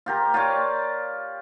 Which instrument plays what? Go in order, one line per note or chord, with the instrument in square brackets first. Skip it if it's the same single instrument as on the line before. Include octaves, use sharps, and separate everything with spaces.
[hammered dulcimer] F4 G4 A#4
F4 G4 C#5 D5